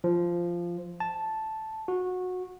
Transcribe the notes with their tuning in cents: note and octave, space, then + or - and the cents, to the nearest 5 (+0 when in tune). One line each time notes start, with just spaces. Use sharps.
F3 -10
A5 -5
F#4 -20